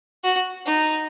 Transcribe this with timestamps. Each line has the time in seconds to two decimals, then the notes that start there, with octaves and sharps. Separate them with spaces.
0.24 F#4
0.67 D#4